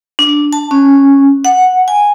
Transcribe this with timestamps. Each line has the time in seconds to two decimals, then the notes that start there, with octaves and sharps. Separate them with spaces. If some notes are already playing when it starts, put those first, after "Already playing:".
0.19 D4
0.53 A5
0.71 C#4
1.45 F#5
1.88 G#5